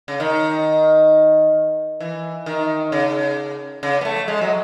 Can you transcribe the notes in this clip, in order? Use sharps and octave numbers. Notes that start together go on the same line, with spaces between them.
C#3
D#3
E3
D#3
C#3
C#3
B3
A3
G#3
F#3